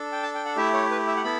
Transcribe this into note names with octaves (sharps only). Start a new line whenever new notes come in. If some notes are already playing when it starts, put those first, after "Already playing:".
Already playing: D4 A4
G5
A5
G5
F#5
A3 E4 G4 E5
C#5
B4
E5
F#5
B3 E4 A4 B5